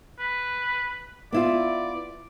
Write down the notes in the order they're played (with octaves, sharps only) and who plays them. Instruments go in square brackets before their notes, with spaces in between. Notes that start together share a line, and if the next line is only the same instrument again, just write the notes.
[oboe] B4
[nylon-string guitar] B3 E4 F4 [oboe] D5